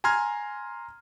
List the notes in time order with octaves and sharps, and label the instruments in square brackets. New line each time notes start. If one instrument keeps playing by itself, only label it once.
[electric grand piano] G#5 A#5 C6 F6 G#6